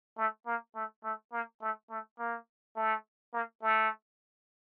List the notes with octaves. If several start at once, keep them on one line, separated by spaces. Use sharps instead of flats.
A3
A#3
A3
A3
A#3
A3
A3
A#3
A3
A#3
A3